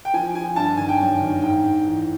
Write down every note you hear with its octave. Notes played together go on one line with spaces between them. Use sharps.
G5
F3 G#5
F3 G#5
G2 A5
D#3 G#5
G5
F#2 G#5
D#3
G#2 G5
G#2
E3